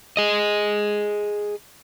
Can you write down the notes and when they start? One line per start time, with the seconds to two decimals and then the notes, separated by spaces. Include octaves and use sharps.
0.17 G#4 D#5